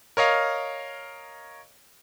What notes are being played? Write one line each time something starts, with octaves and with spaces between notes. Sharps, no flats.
A#4 C#5 D#5 F5